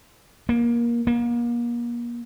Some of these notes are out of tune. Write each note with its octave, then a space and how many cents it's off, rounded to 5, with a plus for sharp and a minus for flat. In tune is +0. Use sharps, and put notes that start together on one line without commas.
A#3 +20
A#3 +35